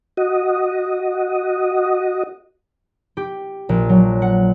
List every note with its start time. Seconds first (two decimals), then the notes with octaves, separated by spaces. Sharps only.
0.17 F#4 D#5
3.17 G4
3.69 A#1
3.89 F#3
4.22 F#5